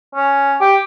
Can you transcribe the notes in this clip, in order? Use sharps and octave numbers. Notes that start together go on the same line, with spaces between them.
C#4
G4